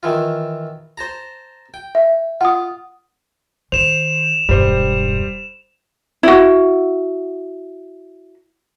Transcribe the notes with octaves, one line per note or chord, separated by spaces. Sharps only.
D#3 E3 F4
C5 A5 A#5
G5
E5
F4 F#5 D#6
D#3 C5 E7 F7
E1 G2 G3 C5
E4 F#4